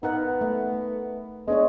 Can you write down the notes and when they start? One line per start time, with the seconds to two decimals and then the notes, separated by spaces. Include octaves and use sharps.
0.03 B3 D#4 A#4 F#5
0.41 A3
1.48 G#3 B3 D4 C#5